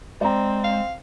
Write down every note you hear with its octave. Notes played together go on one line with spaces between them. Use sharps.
G#3 C4 D5 A#5
F5